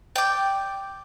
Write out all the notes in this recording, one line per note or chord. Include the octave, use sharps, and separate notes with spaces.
D5 G5